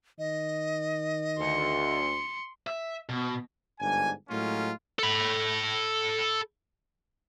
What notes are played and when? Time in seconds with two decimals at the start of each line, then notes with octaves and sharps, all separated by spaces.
0.19 D#3 D#5
1.38 D2 C6 C#7
2.67 E5
3.09 B2 B3
3.80 G1 G#2 D4 G#5
4.30 A2 F#3 G#3 A#3 C#4 F4
4.99 A4 B5